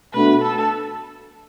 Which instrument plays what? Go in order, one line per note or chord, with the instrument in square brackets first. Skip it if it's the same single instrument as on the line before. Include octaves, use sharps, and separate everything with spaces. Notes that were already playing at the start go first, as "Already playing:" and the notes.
[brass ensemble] B2 A3 D4 F#4 [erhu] B4
[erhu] A4